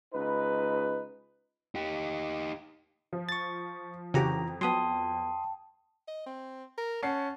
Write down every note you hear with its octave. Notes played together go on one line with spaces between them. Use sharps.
C#2 D#4 B4
D#4 G4
F3
C#6 A6
F2 C#3 E3 F#4 G4 A#5
F#3 B3 G5 A5 C6 D#6
D#5
C4
A#4
C#4 F#5 A5 C7